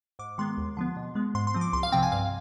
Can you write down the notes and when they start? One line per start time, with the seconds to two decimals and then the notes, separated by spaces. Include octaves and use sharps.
0.19 G#2 D6
0.38 D#3 G#3 B3 C6
0.57 D#2
0.77 D3 F3 B3
0.96 B2
1.15 G#3 B3
1.35 G#2 C6
1.47 C6
1.54 F3 C4
1.61 D6
1.73 C2 C6
1.83 F5
1.92 C3 F3 C4 G5
2.03 G#5
2.12 G2 F5